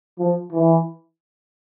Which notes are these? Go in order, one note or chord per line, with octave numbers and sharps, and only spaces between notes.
F3
E3